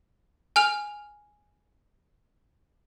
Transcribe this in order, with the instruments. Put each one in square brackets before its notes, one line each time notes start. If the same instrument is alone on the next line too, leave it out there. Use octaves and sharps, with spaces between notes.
[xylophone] G#5 F6 F7